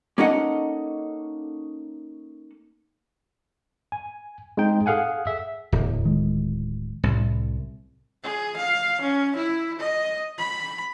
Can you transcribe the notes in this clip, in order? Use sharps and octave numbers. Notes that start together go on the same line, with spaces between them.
A#3 C#4 D#4 A4 D#5 F#5
G#5
G#3 C4 D#4 G5
G#4 A4 F5 F#5 G#5
E5
D1 E2
D#3 G#3
C2 A2
G#4
F5
C#4
E4
D#5
B5